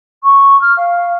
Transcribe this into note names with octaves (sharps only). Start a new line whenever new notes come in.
C#6
F6
F5